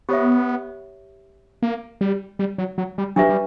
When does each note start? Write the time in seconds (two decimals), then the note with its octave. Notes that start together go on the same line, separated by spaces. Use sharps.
0.09 B3 G4 C#5 E5
1.62 A#3
2.01 G3
2.39 G3
2.58 F#3
2.78 F#3
2.98 G3
3.16 F#3 D4 G4 B4 E5
3.29 G3